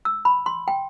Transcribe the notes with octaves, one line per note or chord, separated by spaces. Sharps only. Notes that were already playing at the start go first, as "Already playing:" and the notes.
E6
B5
C6
G5